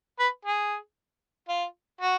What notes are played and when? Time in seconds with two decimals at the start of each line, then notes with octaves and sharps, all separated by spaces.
0.20 B4
0.45 G#4
1.49 F4
2.01 F#4